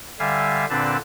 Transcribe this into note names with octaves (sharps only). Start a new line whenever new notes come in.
D3 G3 E5 F5 G#5
A#2 D3 C4 D4 B4 A5